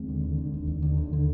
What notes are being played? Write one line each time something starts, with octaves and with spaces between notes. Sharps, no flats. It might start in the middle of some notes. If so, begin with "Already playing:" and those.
Already playing: D#2 G#3 C4
D3
D3
D3
D#2
D#2
D3
D#2
D3